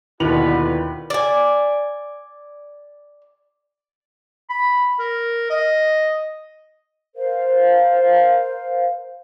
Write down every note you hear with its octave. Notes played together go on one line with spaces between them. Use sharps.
D#2 B2 D3 E4 F4 B4 F7 F#7
D5 G#5
B5
A#4
D#5
A#4 C5 F5